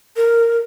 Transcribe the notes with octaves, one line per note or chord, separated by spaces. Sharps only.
A#4